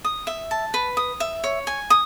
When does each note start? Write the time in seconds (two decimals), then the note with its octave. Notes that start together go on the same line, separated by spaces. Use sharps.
0.05 D#6
0.27 E5
0.51 A5
0.74 B4
0.97 D#6
1.20 E5
1.44 C#5
1.67 G#5
1.90 D#6